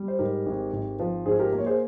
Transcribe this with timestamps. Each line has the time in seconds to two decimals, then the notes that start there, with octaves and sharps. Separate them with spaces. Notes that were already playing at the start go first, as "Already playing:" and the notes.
Already playing: G3
0.08 C5
0.19 G#2 G4 A#4
0.46 G#1
0.73 G#1
1.00 F3
1.26 G#2 G#4 C5
1.39 G4 A#4
1.53 A#3
1.58 C#5
1.66 G#4 C5